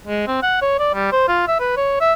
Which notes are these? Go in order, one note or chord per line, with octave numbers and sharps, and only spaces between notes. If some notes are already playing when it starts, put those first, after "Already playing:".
G#3
C4
F#5
C#5
D5
G3
C5
F4
E5
B4
C#5
E5